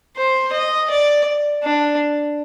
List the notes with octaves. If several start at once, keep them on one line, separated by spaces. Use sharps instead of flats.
C5
D#5
D5
D4